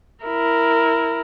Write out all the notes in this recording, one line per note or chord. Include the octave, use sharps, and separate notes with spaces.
E4 A#4